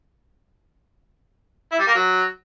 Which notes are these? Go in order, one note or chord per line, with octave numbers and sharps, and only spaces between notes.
E4
G3
A#3
F#3